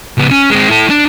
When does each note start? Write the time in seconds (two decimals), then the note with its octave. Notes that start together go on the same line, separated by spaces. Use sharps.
0.18 C#2 B3
0.31 C#4
0.50 G#3 C4
0.69 E4 A4
0.90 D4